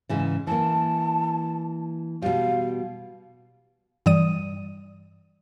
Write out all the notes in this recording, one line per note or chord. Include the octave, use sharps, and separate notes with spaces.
G#2 C#3 E3
E3 A#3 A5
B2 G3 F5
G2 E3 G3 D5 D#6 D#7